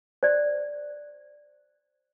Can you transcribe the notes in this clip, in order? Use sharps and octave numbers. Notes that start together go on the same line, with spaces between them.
C5 D5